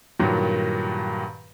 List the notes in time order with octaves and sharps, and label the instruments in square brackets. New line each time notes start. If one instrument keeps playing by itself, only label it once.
[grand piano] G2 A#2 D#3 F#3